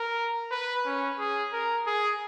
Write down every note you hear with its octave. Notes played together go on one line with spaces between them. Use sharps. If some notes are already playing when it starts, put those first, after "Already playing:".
Already playing: A#4
B4
C#4
G#4
A#4
G#4